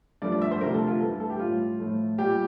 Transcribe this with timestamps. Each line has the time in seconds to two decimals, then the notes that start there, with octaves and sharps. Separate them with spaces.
0.22 G2 F3 A3 D5
0.32 D5
0.42 E5
0.51 C5
0.61 D2 C3 F3 A3 A#4
0.74 A4
0.87 F4
1.00 G2 E3 A3 A4
1.20 A4
1.30 G4
1.39 A2 G3 F4
1.79 A2 F3 A3
2.18 A#2 G3 G4